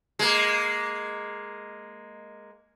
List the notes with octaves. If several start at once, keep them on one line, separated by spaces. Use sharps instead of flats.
G#3 A#3